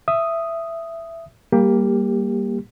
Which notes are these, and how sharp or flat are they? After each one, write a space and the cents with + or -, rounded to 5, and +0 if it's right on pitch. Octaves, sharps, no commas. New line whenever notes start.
E5 +10 D#6 +0
G3 +0 A#3 +0 G4 +20